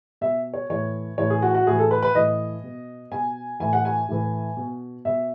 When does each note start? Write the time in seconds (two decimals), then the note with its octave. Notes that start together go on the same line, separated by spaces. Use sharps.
0.21 B2 E5
0.54 C#5
0.70 A2 E3 C#5
1.18 A2 E3 C#5
1.30 G#4
1.42 F#4
1.55 F#4
1.66 A2 E3 G#4
1.79 A4
1.91 B4
2.03 B4
2.15 A2 E3 D#5
2.64 B2
3.11 B2 G#5
3.60 A2 E3 G#5
3.73 F#5
3.85 G#5
4.08 A2 E3
4.57 B2
5.05 B2 E5